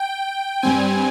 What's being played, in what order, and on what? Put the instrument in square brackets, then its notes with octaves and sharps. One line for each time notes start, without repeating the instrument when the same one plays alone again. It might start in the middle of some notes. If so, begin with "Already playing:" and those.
Already playing: [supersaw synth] G5
G2 G3 C4 G#5